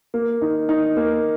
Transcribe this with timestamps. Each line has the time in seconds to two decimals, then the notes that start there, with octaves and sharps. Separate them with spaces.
0.14 A#3
0.42 D#4
0.69 D#4
0.96 A#3